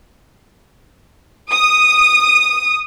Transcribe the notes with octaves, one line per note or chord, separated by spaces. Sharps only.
D#6